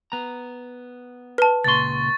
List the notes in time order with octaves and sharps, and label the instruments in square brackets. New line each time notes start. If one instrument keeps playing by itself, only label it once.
[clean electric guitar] B3 A#5
[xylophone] B4 A5
[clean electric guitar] C#2 A#2 C6 [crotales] C#6 A6